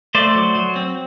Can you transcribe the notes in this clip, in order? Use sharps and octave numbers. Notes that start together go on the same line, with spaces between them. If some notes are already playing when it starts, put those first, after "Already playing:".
A3 C5 D5
F#3
F#3
C4